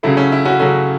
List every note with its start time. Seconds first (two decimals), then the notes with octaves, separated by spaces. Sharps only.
0.03 C#3 F#3 A3 E4
0.17 C#4
0.32 E4
0.45 C#4 F#4
0.60 C#3 F#3 A3 C#4